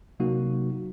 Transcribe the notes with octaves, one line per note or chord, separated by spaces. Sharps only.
C3 F#3 A#3 D#4 F#4